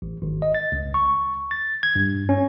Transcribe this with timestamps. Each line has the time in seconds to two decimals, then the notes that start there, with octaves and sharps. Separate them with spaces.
0.02 A1
0.22 G#1
0.42 D#5
0.55 A6
0.72 C#2
0.94 C#6
1.51 A6
1.83 G#6
1.96 G2
2.29 C#4